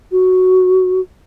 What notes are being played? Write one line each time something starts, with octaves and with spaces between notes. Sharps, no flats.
F#4